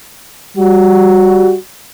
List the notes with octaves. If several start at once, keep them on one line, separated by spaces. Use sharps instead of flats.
G3 F#4